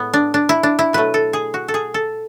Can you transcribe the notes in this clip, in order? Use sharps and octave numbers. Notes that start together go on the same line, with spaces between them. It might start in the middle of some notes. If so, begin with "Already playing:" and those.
Already playing: A2 G#3 B3
D4
D4
E4
D4
E4
B2 F#3 A3 B4
A4
G#4
F#4
A4
G#4
A4